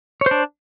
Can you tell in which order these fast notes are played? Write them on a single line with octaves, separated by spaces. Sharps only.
C#5 C5 D4